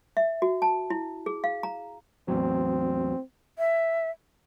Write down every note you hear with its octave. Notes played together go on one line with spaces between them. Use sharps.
E5
F#4
A5
E4
G#4
F5
A#5
E2 A2 F#3 C4
E5